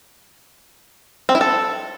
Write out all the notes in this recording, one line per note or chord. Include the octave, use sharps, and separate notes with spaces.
C4
E4
A4